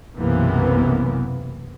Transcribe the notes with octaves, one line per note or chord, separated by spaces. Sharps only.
B1 F#2 C3 E3 A#3 B3